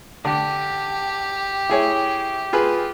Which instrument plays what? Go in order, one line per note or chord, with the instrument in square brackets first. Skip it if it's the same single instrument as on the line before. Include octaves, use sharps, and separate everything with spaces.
[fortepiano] D3 [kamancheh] G4
[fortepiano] E4 G#4 C#5
F4 G#4 B4